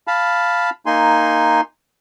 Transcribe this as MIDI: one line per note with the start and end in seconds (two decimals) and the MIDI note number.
0.07 0.70 77
0.07 0.70 81
0.07 0.70 83
0.86 1.61 58
0.86 1.61 63
0.86 1.61 80
0.86 1.61 84